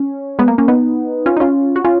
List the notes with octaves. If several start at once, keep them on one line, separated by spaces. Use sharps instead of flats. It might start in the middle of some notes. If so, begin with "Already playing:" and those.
Already playing: C#4
G#3 B3
A#3
A#3 C#4
B3 D#4
C#4 F4
D#4
C#4 F4
F#4
C#4 F4